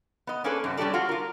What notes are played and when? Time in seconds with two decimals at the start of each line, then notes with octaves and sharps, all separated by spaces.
0.27 B3 D#5
0.44 A#3 C#4 D4 G#4 A4 B4
0.64 F#2 C3
0.77 G3 C#4 D4 G4 A4 D5
0.94 F4 F#4
1.09 F4 A#4